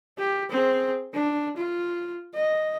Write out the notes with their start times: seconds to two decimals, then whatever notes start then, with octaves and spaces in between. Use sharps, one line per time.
0.18 G4
0.50 C4 G#4
1.14 D4
1.57 F4
2.35 D#5